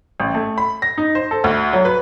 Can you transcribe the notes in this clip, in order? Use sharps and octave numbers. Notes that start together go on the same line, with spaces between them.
A1
A3
B5
A#6
D#4
C5
A4
D2
F#3
B4